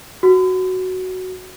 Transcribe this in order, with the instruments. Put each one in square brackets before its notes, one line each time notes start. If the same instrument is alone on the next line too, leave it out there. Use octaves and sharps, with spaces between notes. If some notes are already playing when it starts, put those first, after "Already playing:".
[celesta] F#4